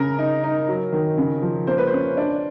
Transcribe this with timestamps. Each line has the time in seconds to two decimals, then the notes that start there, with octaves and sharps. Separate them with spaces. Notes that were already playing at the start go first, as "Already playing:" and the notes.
Already playing: C#3 A#4
0.19 D#4
0.44 D#4
0.68 F#3
0.93 D#3
1.17 C#3
1.42 F3
1.67 A#3 C5
1.78 B4
1.87 C5
1.93 C#4
2.17 D4